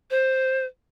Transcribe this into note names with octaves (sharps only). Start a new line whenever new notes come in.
C5